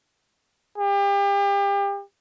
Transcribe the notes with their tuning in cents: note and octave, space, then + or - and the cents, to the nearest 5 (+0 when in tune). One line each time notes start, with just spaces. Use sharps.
G4 +35